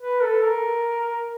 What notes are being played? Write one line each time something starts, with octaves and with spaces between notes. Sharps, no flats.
B4
A4
A#4